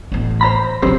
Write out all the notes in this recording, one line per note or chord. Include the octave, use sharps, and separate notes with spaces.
A1 B3
C5 A#5 B5
C#3 F#3 C4 G4 C5